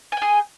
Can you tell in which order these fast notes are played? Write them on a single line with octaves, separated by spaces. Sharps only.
G#5 G5 G#4